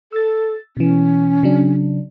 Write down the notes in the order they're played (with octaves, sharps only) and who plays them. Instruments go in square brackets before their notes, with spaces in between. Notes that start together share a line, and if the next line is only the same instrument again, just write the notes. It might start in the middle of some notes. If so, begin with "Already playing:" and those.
[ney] A4 [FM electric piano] E6 A6
[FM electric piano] B2 E3 [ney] C#4
[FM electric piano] C#3 F#3 D4